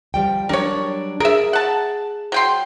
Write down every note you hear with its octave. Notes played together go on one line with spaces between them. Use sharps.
F3 G3 G5
F#3 G3 D4 A#4 C#5
G#4 A#4 E5
F#5 A5
F#3 G5 C6